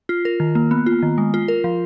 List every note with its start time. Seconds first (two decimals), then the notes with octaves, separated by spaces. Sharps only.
0.09 F4
0.25 A#4
0.40 D#3
0.55 A#3
0.71 B3
0.86 F4
1.03 D#3
1.18 G#3
1.34 F4
1.48 A#4
1.64 F3